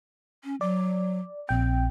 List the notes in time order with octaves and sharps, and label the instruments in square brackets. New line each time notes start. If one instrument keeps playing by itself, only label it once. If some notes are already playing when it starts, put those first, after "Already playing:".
[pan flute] C#4
[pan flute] F#3 [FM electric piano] D5
[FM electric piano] A#1 G5 [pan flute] C4